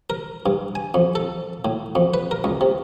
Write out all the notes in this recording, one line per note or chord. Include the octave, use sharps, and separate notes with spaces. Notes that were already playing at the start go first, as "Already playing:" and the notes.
A#4
G2
G#5
F2
A4
A2
F2
B4
A#4
C#2
C3